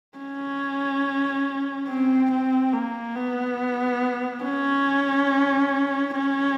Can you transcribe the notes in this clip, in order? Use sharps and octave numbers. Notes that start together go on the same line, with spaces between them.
C#4
C4
C4
A#3
B3
C#4
C#4